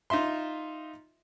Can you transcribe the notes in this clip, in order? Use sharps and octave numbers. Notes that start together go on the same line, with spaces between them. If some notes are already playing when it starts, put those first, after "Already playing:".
D#4 F4 E5 C6